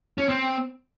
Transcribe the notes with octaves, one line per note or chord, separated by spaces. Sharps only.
C#4
C4